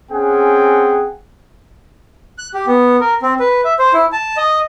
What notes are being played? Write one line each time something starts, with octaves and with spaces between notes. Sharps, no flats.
C4 C#4 G#4 F#5 G5
F#6
G4
B3
A#4
C4
B4
E5
C5
E4
A5
D#5